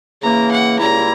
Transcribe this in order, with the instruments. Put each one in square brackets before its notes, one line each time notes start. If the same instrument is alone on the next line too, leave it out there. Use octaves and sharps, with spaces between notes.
[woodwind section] C#3 E3 A#3 [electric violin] A#5
[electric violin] F#5
[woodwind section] C#2 C#3 G3 A#3 E4 [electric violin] A#5